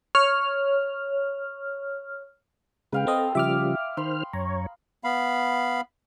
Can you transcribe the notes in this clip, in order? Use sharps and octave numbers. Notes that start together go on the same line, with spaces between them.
C#5 F6
C#3 G#3 B4 F5 G5
C4 A4 D#5 C6 D#6
C#3 F3 G3 E5 D6 F6
D#3 C5 B5 C6 F6
F#2 C#5 A#5
B3 F5 B5